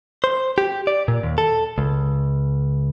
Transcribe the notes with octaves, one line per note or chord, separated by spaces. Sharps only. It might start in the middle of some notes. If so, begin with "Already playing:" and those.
C5
G4
D5
A#2
D#2
A4
C#2